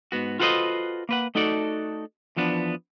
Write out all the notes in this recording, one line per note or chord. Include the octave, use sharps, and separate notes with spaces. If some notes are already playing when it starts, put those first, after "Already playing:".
G#2 B3 F#4
F4 F#4 A4 B4 C5 D#5
A#3 B4 F#5
A3 D#4 F#4 A4 D5
E2 F3 B3 D4